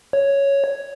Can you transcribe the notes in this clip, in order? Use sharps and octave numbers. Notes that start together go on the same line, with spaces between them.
C#5